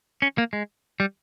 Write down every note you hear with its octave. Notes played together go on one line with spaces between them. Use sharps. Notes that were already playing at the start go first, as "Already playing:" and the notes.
C#4
A#3
G#3
G3